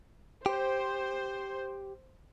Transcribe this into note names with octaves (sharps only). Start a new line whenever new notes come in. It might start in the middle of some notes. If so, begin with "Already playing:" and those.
G4 C5